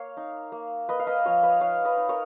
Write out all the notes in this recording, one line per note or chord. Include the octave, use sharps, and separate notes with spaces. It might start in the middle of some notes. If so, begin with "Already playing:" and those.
Already playing: A#3 C#5 F5
D#4
A#3
A#3 B4 D#5
F5
B4 D#5
F3 C#5 F5
B4 D#5
D#4 C#5 F5
B4 D#5
D#4
A#4 C#5